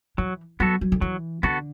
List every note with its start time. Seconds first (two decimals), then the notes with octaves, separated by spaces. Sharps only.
0.18 E3 F#3
0.60 F#3 B3 F#4 A4
0.81 F#3
0.92 D3
1.01 E3 F#3
1.43 D3 B3 F#4 A4